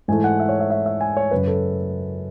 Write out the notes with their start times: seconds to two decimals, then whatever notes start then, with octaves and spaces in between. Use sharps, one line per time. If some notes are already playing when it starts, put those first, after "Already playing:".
0.08 G#2 E3 A3 G#5
0.24 F#5
0.40 E5
0.49 C#5
0.60 E5
0.70 E5
0.86 E5
1.01 G#5
1.17 C#5
1.31 F#2 C#3 F#3 B4
1.47 A4